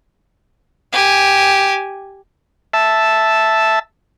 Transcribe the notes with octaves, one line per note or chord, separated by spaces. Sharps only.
G4 G#5
E5 A5